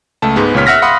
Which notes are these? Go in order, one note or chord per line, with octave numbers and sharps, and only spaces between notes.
C#2 A3 A5
G#2 G#3 B3
C#2 A#2 C#5 F6 B6
E5 F#5 F6 A#6 B6
F5 F#5 B5 C6 D#6